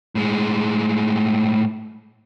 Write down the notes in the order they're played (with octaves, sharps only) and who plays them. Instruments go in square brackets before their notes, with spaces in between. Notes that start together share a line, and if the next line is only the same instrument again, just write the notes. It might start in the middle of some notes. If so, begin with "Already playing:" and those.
[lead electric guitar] A2 G#3